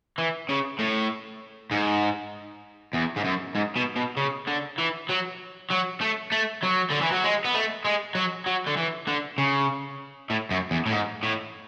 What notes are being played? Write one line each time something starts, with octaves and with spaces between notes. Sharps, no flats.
E3
C#3
A2
G#2
E2
G#2
F#2
G#2
B2
B2
C#3
D3
E3
F#3
F#3
A3
A3
F#3
D3
E3
F#3
G#3
B3
A3
G#3
F#3
F#3
D3
E3
D3
C#3
A2
F#2
E2
A2
G#2
A2